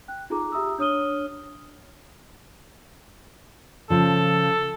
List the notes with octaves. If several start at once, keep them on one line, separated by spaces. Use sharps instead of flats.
G5 F#6
D#4 F4 G#4 A4 A#5 D6
G4 E5 A#5 D#6 E6
D4 C#5 D#6 F6 D#7 G7
C#3 F3 A4